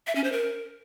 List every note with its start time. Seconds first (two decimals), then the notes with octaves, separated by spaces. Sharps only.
0.07 E5
0.16 C#4
0.24 C5
0.32 A#4